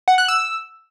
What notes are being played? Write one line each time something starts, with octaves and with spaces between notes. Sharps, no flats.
F#5
F#6
E6